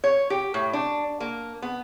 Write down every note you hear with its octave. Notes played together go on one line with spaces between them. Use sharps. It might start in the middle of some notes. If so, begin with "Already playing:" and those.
C#5
G4
A2
D4
A#3
B3